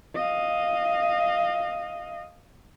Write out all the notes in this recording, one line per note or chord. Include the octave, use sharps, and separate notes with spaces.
D#5 F5